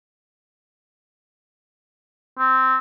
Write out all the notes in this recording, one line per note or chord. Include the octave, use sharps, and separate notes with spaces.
C4